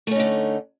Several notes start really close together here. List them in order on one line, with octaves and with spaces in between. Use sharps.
A3 C#4 D#4 D3